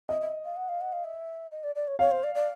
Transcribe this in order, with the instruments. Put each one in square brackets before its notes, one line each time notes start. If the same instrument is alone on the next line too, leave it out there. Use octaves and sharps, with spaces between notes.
[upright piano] D#5 [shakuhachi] E5
[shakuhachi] E5
F5
F#5
F5
F#5
F5
E5
D#5
D5
D5
C#5
[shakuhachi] C#5 [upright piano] F5
[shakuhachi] C5
D5
D5